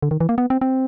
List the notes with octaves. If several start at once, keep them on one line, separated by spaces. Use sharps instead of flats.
D3
D#3
E3
A#3
B3
C4
C4